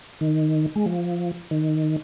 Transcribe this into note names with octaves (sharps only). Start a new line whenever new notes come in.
D#3
G#3
F3
D#3